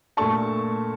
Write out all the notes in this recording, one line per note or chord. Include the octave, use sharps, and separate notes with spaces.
A#2 A3 D4 A5 C#6